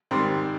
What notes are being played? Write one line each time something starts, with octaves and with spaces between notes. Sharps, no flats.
G#2 D#3 G3 C4